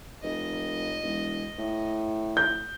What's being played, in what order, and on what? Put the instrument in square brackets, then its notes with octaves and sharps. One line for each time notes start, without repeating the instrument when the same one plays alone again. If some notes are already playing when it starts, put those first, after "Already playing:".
[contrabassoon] F1 [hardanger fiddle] D#5
[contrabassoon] E1
A2
[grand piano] G6